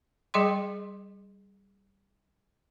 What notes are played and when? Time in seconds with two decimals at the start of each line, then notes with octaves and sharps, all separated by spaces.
0.34 G3 G#4 D#5 G5 C6